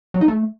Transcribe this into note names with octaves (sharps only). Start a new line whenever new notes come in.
F#3
D#4
A3